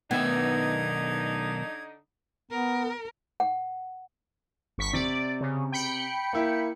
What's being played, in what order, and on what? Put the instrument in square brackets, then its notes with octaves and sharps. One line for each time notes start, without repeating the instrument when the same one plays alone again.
[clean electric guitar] B1 D#3 E5 [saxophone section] D3 D4 D#4 [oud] B3 [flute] G#6
[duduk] B3 [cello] A#4
[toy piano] F#5
[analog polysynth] G1 C#6 B6
[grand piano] C3 [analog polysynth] D5
[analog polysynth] C#3
G5 B5 C#7
[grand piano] A#3 E4